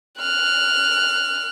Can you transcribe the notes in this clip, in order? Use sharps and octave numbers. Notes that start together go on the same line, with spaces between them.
F6 F#6